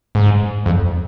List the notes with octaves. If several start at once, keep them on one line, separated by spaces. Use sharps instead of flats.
G#2
F2